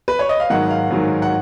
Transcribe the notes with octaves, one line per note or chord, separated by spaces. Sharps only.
B4
C#5
D#5
F5
G#2 D#3 F#3 F#5
F5
G#2 D#3 F#3
F#5